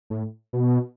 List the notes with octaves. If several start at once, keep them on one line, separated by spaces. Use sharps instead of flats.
A2
B2